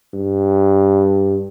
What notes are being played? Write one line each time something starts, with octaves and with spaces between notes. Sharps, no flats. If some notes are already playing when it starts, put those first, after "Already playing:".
G2